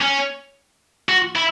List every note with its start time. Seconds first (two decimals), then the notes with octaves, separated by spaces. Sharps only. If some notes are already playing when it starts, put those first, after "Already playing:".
0.01 C#4
1.09 F#4
1.36 E4